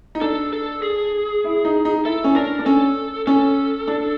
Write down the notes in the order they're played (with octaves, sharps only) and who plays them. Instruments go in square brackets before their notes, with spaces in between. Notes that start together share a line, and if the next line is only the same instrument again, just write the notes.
[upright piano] D#4
[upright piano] D4 [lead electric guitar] A4
[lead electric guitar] A4
G#4
[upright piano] E4
D#4
D#4
[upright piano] E4 [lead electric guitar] A4
[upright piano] C#4
[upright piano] D4 [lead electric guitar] A#4
[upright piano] D4
[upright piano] C#4 [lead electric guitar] A4
[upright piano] C#4 [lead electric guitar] A4
[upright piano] D4